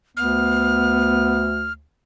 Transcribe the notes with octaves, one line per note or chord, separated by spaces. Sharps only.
D2 B3 F6